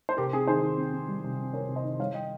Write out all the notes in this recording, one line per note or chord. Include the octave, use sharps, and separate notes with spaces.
C5
C3 G4 A#4
C4 G#4
D#3 G#4 C5
D#3
C4
C4
G3
C3
C4
C4 A#4 C#5
C3
C5 D#5
D#3
G3 C#5 F5
D#5 G5